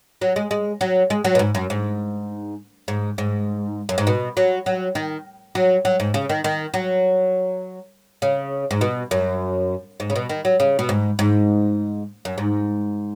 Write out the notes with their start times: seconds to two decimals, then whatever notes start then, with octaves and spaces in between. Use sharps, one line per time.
0.21 F#3
0.36 G#3
0.51 G#3
0.81 F#3
1.10 G#3
1.24 F#3
1.35 B2
1.39 G#2
1.55 F#2
1.70 G#2
2.88 G#2
3.18 G#2
3.89 F#2
3.98 G#2
4.07 B2
4.37 F#3
4.66 F#3
4.95 D#3
5.55 F#3
5.85 F#3
6.00 G#2
6.14 C#3
6.29 D#3
6.44 D#3
6.74 F#3
8.22 C#3
8.71 G#2
8.81 B2
9.11 F#2
10.00 G#2
10.10 C#3
10.16 B2
10.29 D#3
10.45 F#3
10.60 C#3
10.79 B2
10.89 G#2
11.19 G#2
12.25 F#2
12.38 G#2